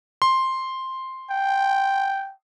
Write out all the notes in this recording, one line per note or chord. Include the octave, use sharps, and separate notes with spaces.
C6
G5